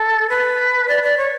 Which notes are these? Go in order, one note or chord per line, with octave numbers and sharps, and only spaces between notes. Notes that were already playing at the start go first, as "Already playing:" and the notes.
Already playing: A4
B4
D5
D5
C#5